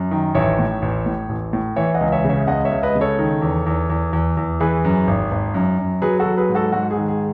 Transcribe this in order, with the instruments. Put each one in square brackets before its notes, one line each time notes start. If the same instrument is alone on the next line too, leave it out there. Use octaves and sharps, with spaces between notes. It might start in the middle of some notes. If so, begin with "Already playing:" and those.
Already playing: [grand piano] F#2
D#3
A1 C#5 E5
A2
A1
A2
A1
A2
E3 C#5 E5
D#5 F#5
C#2
C#5 E5
C#3
C#5 E5
C#2 D#5 F#5
C#5 E5
C#2
B4 D#5
C#3
A4 C#5
D#3
E2
E2
E2
E2
E2
E3 G#4 B4
F#2
G#1
G#1
F#2
F#2
F#3 G#4 B4
F#4 A4
F#3
G#4 B4
G#2
F#4 A4
G#2 F#4
G#4
D#3
G#4